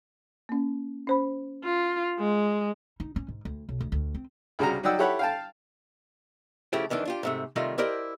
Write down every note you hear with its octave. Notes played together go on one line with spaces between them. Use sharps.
A#3 C#4
C#4 C5 B5
F4
G#3
D#4
C#4
G#2
D2
B1
D2
D2
C4
C2 C#3 G3 F#4 A#5
F#3 D#4 D5 F#5 G5 E6
E4 G4 A4 C#5 F#5 B5
F5 G5 A5
C#3 F3 A3 E4 G4
F2 D#3 E3 D4
D4 F4 G4
G#2 C3 A3
C3 D#3 G3 A3 D#4 F4
E4 G4 A#4 C5 D5 D#5